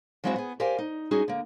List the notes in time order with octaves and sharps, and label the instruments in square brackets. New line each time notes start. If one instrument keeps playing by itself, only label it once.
[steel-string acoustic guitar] F3 F#3 G#3 C4 E4 F#4
B3 G#4
G4 A#4 C5 D5 F5 G#5
D#4
G3 C#4 D#4 F#4 G#4
D3 A#3